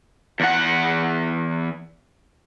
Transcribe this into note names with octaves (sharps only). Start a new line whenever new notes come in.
E2 F#5